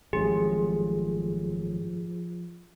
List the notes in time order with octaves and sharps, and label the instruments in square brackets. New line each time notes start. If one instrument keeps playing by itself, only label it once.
[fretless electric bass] G#1 F#2 A2 [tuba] F3 [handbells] G4 [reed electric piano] G#4